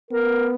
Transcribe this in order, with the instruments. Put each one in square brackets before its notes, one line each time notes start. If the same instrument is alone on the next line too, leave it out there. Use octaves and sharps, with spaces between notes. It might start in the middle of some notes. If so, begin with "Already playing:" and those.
[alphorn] B3 [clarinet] A#4